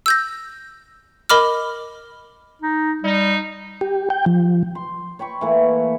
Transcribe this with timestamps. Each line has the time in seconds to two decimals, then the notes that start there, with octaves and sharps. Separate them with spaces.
0.06 E6 G6 A#6
1.29 A#4 D#5 B5 D6 F6
2.62 D#4
3.04 G3 D#4
3.81 G4
4.10 G5
4.26 F3
4.75 C6
5.19 C#5 G5 B5 C#6
5.41 E3 A3 A#3